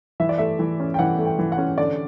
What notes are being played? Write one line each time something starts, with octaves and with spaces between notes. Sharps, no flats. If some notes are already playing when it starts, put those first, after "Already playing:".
E3 E5
D5
A3 E5
E3
C#4
G5
E3 F#5
A3
G5
E3
F#5
C#4
D3 D5